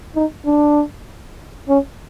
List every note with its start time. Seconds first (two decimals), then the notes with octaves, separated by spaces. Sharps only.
0.16 D#4
0.46 D4
1.68 C#4